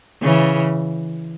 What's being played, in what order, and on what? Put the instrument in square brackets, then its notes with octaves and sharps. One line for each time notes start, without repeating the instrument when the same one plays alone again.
[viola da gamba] C#3 E3